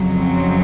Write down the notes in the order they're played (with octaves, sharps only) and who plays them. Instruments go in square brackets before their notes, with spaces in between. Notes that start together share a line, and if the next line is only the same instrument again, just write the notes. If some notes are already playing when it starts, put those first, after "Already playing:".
Already playing: [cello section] F2 C#3 F#3
C4